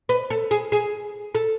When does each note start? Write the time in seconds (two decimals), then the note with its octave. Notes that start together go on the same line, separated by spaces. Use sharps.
0.09 B4
0.30 A4
0.51 G#4
0.72 G#4
1.35 A4